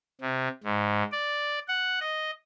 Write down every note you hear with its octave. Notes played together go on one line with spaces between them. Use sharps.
C3
G#2
D5
F#5
D#5